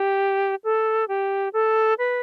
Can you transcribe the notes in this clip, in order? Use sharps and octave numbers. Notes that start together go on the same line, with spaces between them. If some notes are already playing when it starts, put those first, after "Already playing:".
Already playing: G4
A4
G4
A4
B4